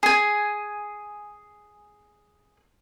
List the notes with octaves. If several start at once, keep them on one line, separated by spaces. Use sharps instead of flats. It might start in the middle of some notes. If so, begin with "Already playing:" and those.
G#4 G#5